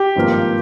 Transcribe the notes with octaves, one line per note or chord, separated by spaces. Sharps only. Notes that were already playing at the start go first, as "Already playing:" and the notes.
Already playing: G4
G#1 G2 F3 A#3